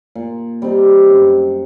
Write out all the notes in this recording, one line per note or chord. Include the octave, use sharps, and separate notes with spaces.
A#2
G3 C4 D#4
F#2